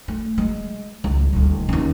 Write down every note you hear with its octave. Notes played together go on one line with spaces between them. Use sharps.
A3
G#3
C#2
D#1 D2
D#2 C#4